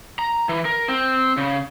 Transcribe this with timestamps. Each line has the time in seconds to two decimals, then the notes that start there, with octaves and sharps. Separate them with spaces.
0.19 A#5
0.49 E3
0.65 A#4
0.88 C4
1.37 C#3